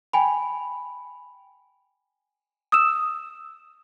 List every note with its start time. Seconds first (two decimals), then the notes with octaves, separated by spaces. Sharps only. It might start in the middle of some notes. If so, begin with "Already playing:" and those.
0.13 G5 G#5 B5
2.72 D#6 E6 E7